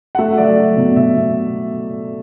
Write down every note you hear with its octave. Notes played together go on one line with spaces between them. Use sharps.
F#5
A3 E5
F#3 D5
E5
F#3
B2
B2 E5
B2